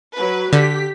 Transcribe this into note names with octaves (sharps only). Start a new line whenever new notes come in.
F#3 B4
D3 G4 B6